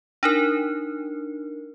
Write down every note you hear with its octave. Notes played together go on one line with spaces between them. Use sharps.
D4 D#4 A#4